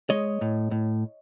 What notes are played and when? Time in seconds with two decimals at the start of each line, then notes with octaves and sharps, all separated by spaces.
0.10 G#3 C#5 D#5
0.41 A2
0.71 A2